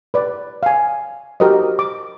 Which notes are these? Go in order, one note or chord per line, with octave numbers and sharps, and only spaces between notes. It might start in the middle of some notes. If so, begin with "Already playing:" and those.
B4 D5
F5 G#5
F#4 G4 A#4 C5 D#5
D6